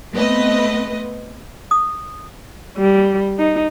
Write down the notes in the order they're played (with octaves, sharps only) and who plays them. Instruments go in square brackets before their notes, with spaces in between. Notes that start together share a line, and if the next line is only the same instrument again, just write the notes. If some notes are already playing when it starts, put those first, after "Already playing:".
[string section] A3 B3 C4 B4 D#5
[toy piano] D#6
[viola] G3
D#4